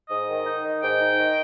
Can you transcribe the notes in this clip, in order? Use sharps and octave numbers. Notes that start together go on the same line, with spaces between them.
G#2 D#5
D#3
D#4
D#3
G#2 G5
D#4
D#3